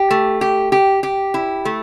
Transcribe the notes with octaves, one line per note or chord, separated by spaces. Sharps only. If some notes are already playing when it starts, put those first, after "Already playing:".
Already playing: G4
A3
G4
G4
G4
E4
A3